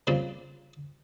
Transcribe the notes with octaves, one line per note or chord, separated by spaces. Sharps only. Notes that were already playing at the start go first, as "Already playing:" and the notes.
A#2 C#3 G3 C4